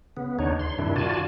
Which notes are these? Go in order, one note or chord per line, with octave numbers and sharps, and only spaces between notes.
C#3 B3
D#2 D4 D#4 C#5
C6
G2 C3 D#3 D4 E4
F4 F#4 D5 G#5 A5